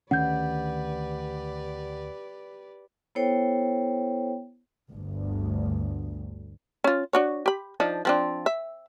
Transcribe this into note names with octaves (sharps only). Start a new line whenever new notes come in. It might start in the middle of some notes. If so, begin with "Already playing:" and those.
D2 D#3 C#4 G4 B4 D5 F#5 G6
B3 E4 A4 C5 C#5 G5
G1 D2
C#4 F4
D4 F#4 C#5
G4 B5
F3 D4 D#4
F3 C4 D4
E5